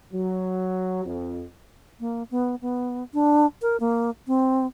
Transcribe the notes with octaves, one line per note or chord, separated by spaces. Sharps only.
F#3
F2
A#3
B3
B3
D4
A#4
A#3
C4